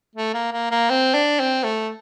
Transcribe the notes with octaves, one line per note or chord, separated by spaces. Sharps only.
A3
A#3
A#3
A#3
C4
D4
C4
A3